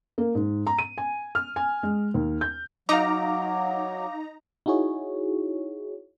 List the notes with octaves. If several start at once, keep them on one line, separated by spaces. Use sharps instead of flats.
A#3
G#2
A#5
D#7
G#5
F6
G#5
G#3
D#2
G6
F#3 D#4 F5 A#5 D6
D#4 E4 F#4 G#4 C#5